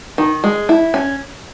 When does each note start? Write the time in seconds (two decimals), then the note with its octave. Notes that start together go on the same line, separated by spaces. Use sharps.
0.18 D#3
0.44 G#3
0.69 E4
0.94 C#4